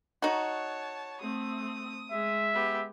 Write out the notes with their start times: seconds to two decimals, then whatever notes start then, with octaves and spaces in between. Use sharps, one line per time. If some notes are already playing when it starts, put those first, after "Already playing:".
0.22 D#4 F#4 C#5 A5
1.21 A3 C4 D#6
2.11 G#3 E5
2.54 B3 G4